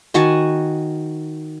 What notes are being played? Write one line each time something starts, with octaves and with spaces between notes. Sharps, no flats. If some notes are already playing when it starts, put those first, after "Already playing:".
D#3 F#4 G#5 A5